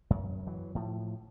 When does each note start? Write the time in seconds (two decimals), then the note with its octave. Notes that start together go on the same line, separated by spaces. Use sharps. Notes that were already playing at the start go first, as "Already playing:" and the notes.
0.10 F#2
0.47 E3 F#3
0.75 A2 F3